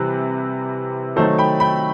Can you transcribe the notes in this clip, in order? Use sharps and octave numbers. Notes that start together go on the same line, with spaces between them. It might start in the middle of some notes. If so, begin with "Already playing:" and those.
Already playing: C3 E3 G3 C4 E4 B4
D#3 F#3 A3 D#4 A4 C5
G5 B5
G5 B5